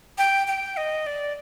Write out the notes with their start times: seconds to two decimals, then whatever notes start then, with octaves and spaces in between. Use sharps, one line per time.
0.18 G5
0.48 G5
0.77 D#5
1.06 D5